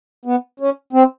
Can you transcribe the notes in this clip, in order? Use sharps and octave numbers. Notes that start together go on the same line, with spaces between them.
B3
C#4
C4